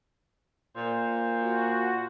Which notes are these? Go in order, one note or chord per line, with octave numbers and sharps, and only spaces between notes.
A#2 C5
F#4